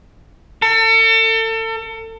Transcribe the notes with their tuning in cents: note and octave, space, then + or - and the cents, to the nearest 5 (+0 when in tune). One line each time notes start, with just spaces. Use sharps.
A4 +35